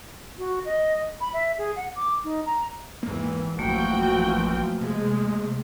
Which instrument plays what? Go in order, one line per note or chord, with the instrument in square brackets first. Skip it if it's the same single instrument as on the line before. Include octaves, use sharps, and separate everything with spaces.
[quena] F#4
D#5
B5
E5
G#4
F#5
D6
D#4
A#5
[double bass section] G#1 E2 E3 [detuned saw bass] A#3
[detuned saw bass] A1 [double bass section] F#2 E3 F3 [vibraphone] A3 A#3 [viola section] F#4 G5
[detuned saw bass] C3 [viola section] G#3